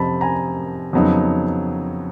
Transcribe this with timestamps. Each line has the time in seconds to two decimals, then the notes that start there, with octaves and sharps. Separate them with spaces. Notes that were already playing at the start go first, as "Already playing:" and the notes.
Already playing: F2 C3 F3 A5 B5
0.21 G#5 A#5
0.93 F2 C#3 F#3 B3 D#4